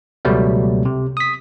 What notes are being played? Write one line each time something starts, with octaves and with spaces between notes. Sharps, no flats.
C#2 B2 F#3 G3 A3 B3
C3
D#6 B6